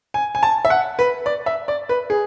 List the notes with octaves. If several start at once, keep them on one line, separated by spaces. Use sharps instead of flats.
G#5
G#5
A5
E5
F#5
B4
D5
E5
D5
B4
G#4